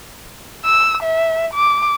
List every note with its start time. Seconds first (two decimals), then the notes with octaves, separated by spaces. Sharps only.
0.65 E6
1.03 E5
1.54 D6